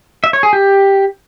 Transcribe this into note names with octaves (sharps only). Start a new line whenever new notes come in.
E5
C#5
G#4
G4